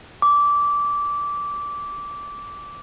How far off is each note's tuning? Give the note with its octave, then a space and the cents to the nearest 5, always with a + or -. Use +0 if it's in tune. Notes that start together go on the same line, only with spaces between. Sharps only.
D6 -15